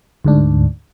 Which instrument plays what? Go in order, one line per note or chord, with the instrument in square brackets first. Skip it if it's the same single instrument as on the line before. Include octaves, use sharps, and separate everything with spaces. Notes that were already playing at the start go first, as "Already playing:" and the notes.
[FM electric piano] D2 G#2 D4